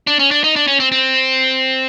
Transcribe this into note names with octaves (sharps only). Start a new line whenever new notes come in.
D4
C#4
D4
D#4
D4
C#4
C4
C4